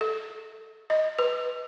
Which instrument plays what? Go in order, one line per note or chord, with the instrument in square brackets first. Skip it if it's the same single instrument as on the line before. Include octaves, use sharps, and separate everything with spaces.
[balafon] A4
D#5
B4